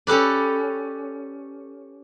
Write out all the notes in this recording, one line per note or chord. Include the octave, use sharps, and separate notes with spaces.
C#4 G4 A4 B4 D5